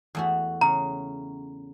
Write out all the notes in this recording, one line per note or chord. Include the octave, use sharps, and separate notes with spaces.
E2 A3 F#4
C#3 A#5